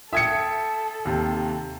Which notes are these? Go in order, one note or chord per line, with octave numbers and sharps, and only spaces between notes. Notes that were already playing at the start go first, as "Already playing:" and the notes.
A4 E5 G5 D#6 G#6 C#7
D#2 C3